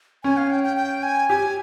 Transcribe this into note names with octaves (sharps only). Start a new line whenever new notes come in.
C#4 G#5
F5
G5
G5
G5
G#5
G4 G#5